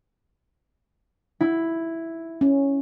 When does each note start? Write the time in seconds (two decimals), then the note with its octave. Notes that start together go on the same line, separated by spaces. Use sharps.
1.41 E4
2.41 C#4